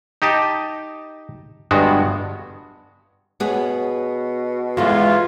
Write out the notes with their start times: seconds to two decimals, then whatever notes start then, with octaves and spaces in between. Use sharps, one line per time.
0.22 D#4 G4 D#5 A5
1.71 G1 G2 G#3 B3 F#4
3.40 B2 B3 G#4 C#5
4.77 E2 F#3 G#3 F4 A4